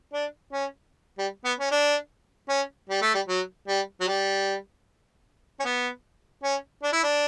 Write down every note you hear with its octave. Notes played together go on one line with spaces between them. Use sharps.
D4
C#4
G3
B3
C#4
D4
C#4
G3
A3
G3
F#3
G3
F#3
G3
C#4
B3
C#4
D4
E4
D4